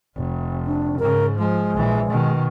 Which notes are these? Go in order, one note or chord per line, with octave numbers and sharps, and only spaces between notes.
F1
D4
G#2 C#3 A#4
F3 G#3
A#1 E3
B2 D#3